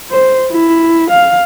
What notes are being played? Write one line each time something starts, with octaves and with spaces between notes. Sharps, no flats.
C5
E4
F5